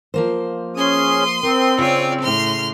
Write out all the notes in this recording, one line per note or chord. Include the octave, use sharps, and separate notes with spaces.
F3 A#3 C5
C#4 G#4 C6 D#6
C4 A#4
C#3 F4 C#5 D5
A2 C6 F6